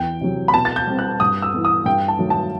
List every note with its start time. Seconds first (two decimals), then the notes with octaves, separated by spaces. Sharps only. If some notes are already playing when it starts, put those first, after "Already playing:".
Already playing: E2 G5
0.21 C3 F#3
0.48 B5
0.54 B2 A5
0.65 A6
0.76 G6
0.87 G3 C4
0.99 F#6
1.20 G2 D#6
1.42 E6
1.53 E3 B3
1.65 D#6
1.86 G2 G5
2.08 A5
2.19 D#3 F#3 A3
2.30 A5